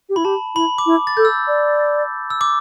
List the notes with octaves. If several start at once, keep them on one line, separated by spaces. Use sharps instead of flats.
G4
E4 B5
G4 A5
E4 B5
D6
E4
A6
A4 G6
E6
D5
E6
D6